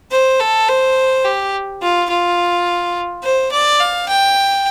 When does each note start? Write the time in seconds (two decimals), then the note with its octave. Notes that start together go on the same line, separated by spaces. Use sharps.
0.11 C5
0.40 A4
0.68 C5
1.25 G4
1.82 F4
2.10 F4
3.23 C5
3.52 D5
3.80 F5
4.08 G5